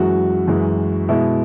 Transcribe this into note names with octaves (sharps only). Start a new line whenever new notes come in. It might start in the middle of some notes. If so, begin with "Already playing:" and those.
Already playing: F#2 E3 G#3 F#4
F#2 E3 G#3
B2 G#3 E4